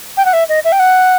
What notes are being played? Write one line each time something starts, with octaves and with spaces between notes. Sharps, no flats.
G5
F#5
E5
D#5
E5
G5
F#5